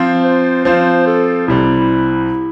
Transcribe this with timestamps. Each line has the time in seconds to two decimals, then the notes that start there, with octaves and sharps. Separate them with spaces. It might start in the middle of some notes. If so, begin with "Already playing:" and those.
Already playing: F3 C4 F4
0.24 C5
0.65 F3 C4 F4 C5
1.07 A4
1.47 C2 C3 G3 C4 E4